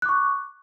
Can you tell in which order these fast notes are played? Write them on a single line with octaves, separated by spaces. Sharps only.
F#6 D6 C#6